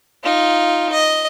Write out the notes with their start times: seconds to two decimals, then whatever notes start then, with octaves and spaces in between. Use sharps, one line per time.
0.24 D#4 F4
0.92 D#5